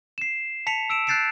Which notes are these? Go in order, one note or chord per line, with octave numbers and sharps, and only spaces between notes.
C7 E7
A5 B6 C#7 F7
E6 D7 E7
F#6 G6 A6 C7 D7 E7